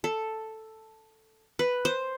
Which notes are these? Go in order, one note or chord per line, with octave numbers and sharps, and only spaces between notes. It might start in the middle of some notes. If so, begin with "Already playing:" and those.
A4
B4
C5